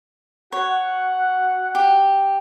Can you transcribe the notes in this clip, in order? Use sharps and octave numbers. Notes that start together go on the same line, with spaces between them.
F#4 C#5 F#5
G4